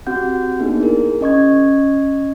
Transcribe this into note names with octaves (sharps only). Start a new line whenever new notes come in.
C4 F#4 G4 F#5 G6
A#3 B3 D4 D#4 G#4
E4 G#4 A#4
C#4 D#5 C#6 G#6